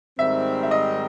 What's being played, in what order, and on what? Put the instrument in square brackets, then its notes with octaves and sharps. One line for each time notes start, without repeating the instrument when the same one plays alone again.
[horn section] G#2 D#3 G3 C4 [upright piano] E5
[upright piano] E5
D#5